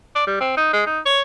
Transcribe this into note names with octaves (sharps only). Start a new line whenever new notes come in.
D5
G3
C4
D#4
G#3
D#4
C#5